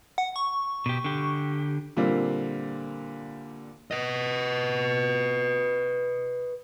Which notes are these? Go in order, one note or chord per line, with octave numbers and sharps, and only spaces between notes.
F#5
C#6
B2 G4
D3 G4
A#2 D3 G3 A#3 C4 F4
B4 D#5